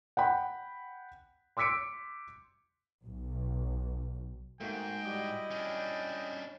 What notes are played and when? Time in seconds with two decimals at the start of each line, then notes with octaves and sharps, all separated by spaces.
0.17 F#5 G5 B5
1.57 C6 D6 E6 B6 C#7 D7
3.05 B1
4.60 G#2 A3 A#3 F#4 G5
5.05 G3 E4 F#4 D#5 D6
5.51 C#4 D4 G5